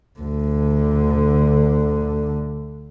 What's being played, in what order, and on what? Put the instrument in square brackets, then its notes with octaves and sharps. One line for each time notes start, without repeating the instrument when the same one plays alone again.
[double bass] D2 D3